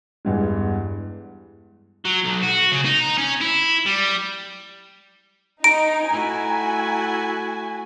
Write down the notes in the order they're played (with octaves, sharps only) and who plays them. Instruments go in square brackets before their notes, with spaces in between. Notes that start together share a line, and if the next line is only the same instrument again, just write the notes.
[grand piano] E2 G2 G#3
[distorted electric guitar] F#3
B1
F#4
C#3
D#4
C#4
E4
G3
[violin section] D#4 [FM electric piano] A#5 [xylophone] D7
[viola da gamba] A3 E4 F#4 [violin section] G#5